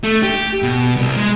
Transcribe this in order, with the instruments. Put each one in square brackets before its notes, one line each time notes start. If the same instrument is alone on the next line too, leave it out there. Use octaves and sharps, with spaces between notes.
[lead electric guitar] A3
G4
B2
C2
G#3